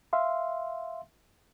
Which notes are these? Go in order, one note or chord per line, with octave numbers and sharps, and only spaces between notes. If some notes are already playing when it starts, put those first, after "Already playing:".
E5 F5 C6